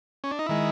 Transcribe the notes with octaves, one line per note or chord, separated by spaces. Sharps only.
C#4
D4
D#4
D#3 G#3 E4